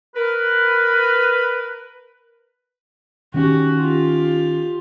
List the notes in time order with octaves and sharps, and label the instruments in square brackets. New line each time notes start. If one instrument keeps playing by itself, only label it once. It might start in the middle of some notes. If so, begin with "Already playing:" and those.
[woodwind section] A#4 B4
[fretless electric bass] D#3 C#4 [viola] F#4 G4
[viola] F4 G4